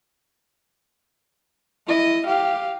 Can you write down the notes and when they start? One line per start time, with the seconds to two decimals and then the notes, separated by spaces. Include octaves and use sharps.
1.87 E4 D#5
2.26 G4 F5